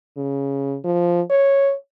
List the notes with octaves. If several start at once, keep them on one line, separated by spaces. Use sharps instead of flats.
C#3
F3
C#5